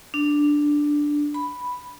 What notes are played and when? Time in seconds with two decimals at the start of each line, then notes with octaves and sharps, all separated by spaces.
0.14 D4
1.34 B5